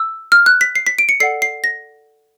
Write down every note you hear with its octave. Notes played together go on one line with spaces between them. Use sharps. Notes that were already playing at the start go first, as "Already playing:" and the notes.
Already playing: E6
F6
F#6
B6
C7
B6
D7
C#7
A4 D5 F#5 C7
C7
A#6